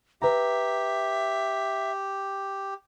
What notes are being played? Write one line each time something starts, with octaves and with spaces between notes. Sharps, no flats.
G4 B4 E5 A#5